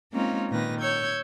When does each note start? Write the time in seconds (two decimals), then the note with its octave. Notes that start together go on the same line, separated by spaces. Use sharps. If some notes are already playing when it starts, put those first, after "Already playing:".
0.12 G#3 A#3 C4 C#4 D#4 F4
0.50 A#2 D#3 B4 A#6
0.79 C#5 E6 G6 G#6